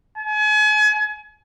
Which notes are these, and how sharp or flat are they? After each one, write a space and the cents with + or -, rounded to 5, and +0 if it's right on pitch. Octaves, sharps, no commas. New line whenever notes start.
G#5 +35